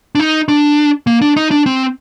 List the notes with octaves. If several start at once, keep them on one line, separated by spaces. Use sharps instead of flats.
D4
D#4
D4
A#3
D4
D#4
D4
C4